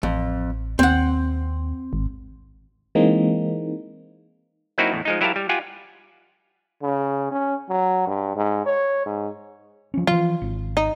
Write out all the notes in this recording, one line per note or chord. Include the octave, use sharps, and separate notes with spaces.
A1 F2
D#2 C4 F#5
G#1
E3 G#3 A#3 C4 D#4
F#3 A#3 C4 D#4 E4 F#4
E2 A2
F3 G#3 D#4
F#3 E4 G4 A#4 F5 A5
G3
F4 G4 F#5 G#5
C#3
C#4
F#3
G2
G#2
C#5
G#2
F3 C#4
E3 F3 F4
G#1
D#4